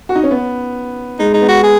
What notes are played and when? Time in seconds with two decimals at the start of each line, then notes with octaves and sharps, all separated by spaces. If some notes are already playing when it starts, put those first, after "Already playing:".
0.09 F#4
0.15 D#4
0.23 C#4
0.31 B3
1.19 G#3 D#4
1.31 G#3 D#4
1.41 B3
1.48 F#4
1.63 G#4